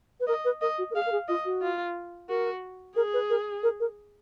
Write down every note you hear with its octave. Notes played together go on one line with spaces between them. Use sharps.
B4
A#4 D#5
B4
A#4 D#5
F#4
A#4
G#4 F5
A#4
G#4
F4 D#5
F#4
F4
F#4 A#4
G#4 A#4
B4
A#4
A#4
A#4